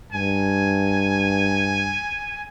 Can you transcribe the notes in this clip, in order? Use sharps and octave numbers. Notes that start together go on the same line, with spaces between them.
G2 G#5